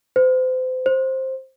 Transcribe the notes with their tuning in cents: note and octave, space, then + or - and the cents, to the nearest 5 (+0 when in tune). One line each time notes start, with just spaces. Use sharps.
C5 -35
C5 +10